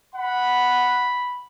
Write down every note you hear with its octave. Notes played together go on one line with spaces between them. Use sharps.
F#5 B5